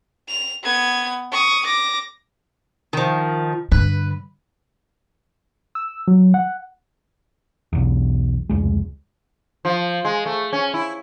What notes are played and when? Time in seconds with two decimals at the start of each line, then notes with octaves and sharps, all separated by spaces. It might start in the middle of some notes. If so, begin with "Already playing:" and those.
0.28 F7
0.63 B3 G#6
1.32 C#6 D#6
1.65 D6 A#6
2.93 D#3 F3
3.72 G2 D3 B4
5.75 E6
6.08 F#3
6.34 F#5
7.73 B1 E2
8.49 F1 C#2 G#3
9.65 F3
10.05 G#3
10.26 A3
10.53 C#4
10.74 E4